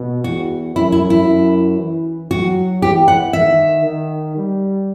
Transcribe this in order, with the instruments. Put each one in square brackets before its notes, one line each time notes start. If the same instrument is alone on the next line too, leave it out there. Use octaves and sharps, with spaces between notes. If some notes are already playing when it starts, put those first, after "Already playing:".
Already playing: [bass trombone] B2
[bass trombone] E2 [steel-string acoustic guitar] F#4
[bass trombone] F#2 [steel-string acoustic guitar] E4
[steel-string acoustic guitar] E4
E4
[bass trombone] F#2
E3
[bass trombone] F#3 [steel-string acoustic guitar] F#4
[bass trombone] E3 [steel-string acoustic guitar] G4
[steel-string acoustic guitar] F#5
[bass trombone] D#3 [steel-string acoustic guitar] E5
[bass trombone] D#3
G3